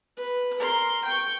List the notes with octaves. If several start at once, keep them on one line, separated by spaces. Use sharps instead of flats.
B4
A#4 C6
G5 C#6